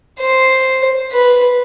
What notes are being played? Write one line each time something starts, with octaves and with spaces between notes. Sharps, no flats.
C5
B4